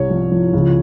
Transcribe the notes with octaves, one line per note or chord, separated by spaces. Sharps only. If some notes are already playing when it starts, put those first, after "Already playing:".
Already playing: C2 C3 C#5
F3
F3
C#2